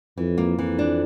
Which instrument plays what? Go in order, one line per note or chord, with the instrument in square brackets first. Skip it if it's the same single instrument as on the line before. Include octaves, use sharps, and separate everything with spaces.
[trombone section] F2 [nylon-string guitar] E3
[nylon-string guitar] A#3
[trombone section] F2 [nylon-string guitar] E3
[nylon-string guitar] D4